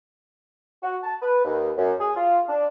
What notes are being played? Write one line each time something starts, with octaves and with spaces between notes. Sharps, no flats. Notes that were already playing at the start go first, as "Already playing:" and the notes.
F#4
A5
B4
D#2
F#2
G#4
F4
D4